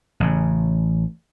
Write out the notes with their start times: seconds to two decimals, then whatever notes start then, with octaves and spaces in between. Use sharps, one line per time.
0.20 A1 C#3